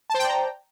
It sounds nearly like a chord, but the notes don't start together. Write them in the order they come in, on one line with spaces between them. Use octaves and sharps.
A5 C5 G5 D5 A#5